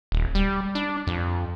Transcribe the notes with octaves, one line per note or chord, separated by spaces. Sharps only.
D#1
G3
D4
F2